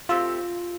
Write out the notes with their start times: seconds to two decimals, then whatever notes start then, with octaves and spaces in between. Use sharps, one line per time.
0.09 A3 C4 F4 G4 C5